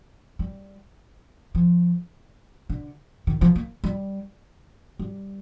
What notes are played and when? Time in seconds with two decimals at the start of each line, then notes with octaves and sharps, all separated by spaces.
0.39 G3
1.55 F3
2.69 D3
3.27 D#3
3.41 F3
3.55 A#3
3.84 G3
4.99 G3